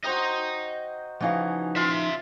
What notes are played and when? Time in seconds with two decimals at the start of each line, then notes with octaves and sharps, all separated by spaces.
0.04 F#4 C5 D#5 G5 A#5
1.20 C#3 E3 F3 D#4 F#4 F5
1.76 F4 E5 C6